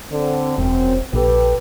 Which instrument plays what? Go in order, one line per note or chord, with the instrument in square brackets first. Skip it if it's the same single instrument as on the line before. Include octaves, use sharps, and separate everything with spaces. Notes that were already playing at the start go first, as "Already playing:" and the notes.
[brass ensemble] D3 C4
[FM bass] E1 [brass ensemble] F#2 C4
[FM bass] A#1 [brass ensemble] G4 A4 B4